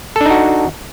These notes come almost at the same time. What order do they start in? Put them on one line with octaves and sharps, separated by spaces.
A4 D4 D#4 F#4